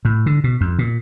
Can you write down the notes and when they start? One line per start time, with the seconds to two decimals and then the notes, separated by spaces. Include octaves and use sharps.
0.05 A2
0.26 D3
0.44 B2
0.61 F2
0.79 A#2